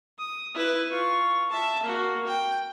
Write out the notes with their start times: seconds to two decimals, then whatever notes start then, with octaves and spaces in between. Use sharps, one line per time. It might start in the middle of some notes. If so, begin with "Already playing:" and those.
0.19 D#6
0.54 E4 B4
0.90 F4 C#6
1.50 E5 A5
1.83 A#3 F#4
2.27 G5